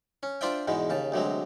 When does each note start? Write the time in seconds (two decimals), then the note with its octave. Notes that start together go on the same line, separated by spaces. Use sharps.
0.23 C#4
0.41 D4 F4 C5 D5 E5 G5
0.67 E2 G#2 B2 G#3
0.90 D#2 C#3 A5
1.12 D2 C3 F#3 G#3